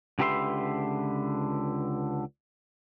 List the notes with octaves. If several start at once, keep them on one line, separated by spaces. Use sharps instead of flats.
C#2 D3 G4 B4 E5 C6